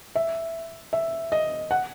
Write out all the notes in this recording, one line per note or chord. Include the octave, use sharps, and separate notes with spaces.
E5
E5
D#5
F#5